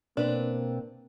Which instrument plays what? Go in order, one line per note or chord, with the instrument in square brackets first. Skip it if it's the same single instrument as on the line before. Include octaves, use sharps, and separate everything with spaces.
[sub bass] B2 [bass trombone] A#3 [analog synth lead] C4 [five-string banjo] D4 B4